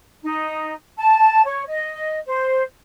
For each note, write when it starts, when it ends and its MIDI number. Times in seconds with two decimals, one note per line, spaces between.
0.22 0.73 63
0.97 1.43 81
1.45 1.64 73
1.68 2.17 75
2.27 2.62 72